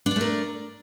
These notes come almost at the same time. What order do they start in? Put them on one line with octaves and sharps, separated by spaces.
D4 D5 A3 A#4